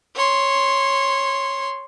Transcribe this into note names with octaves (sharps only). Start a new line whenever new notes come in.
C#5 C6